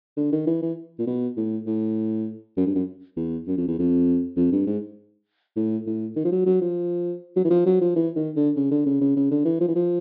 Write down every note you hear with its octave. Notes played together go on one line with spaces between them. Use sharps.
D3
D#3
E3
E3
A#2
B2
A2
A2
F#2
G2
F#2
E2
F#2
F2
E2
F2
F2
G2
G#2
A2
A2
D#3
F3
F#3
F#3
F3
F#3
E3
F3
F#3
F3
E3
D#3
D3
C#3
D3
C#3
C#3
C#3
D3
E3
F3
E3
F3